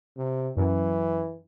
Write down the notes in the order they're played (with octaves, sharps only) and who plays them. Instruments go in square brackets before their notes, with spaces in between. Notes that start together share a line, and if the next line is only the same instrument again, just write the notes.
[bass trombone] C3
[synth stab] F#2 [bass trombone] E3